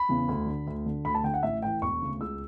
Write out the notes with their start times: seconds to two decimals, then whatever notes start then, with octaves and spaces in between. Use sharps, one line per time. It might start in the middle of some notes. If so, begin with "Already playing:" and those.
Already playing: B5
0.09 E2 C#3 E3
0.28 D2
0.47 D3
0.67 D2
0.86 D3
1.05 D2 B5
1.15 A5
1.24 D3 G5
1.34 F#5
1.43 A1 E5
1.63 A2 E3 G5
1.82 E1 C#6
2.01 D2 C#3
2.21 C#2 E6